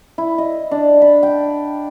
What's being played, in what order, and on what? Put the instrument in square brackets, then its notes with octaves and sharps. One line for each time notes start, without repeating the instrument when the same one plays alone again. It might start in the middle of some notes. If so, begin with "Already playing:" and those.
[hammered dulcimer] E4
D#5
D4
B5
G5